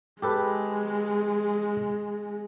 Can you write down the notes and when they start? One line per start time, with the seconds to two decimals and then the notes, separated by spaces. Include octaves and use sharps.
0.22 G#3 G4 A4 B4